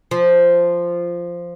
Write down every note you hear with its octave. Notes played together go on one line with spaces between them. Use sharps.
F3